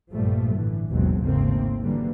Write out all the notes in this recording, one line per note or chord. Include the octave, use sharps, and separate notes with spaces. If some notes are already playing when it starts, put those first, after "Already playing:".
A#1 G2 A#2 F3 G3 A3
A2 D3 E3
G#1 D#2 B2 F#3 G#3 C4
G#1 D#2 C#3 A3 A#3 C4
D3 E3 F#3 G3 A#3